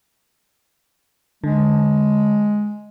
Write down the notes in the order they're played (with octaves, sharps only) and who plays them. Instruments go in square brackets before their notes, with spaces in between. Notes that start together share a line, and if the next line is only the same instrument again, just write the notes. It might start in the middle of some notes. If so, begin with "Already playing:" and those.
[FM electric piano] D3 [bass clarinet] G#3